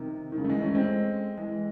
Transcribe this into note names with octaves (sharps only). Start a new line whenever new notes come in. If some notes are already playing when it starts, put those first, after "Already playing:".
Already playing: C3 D#3
D#3
C#3
A3
E3 G#3
A3 C#4
G#3 C4
E3 G#3